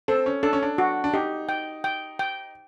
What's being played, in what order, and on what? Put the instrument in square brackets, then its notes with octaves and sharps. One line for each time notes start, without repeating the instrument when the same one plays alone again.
[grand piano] C4 [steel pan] A4
[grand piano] C#4
[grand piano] D4 [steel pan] A4
[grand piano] C#4
D4
[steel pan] F#4
[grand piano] D4
[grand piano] D#4 [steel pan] G4
[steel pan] G5
G5
G5